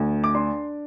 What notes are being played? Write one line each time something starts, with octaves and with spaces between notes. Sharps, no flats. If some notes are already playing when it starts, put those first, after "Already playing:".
Already playing: D2
D6
D4 C6